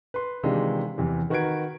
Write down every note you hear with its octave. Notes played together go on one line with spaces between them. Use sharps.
B4 C6
C3 D#3 E3 G#3 D4 F4
E2 C3 E3
D#3 F#4 A#4 B4 G#6 D7